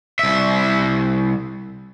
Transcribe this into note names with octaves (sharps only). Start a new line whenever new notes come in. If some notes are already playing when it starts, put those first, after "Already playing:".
C2 E5